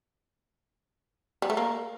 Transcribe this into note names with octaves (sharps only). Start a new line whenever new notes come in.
G3
A3
A#3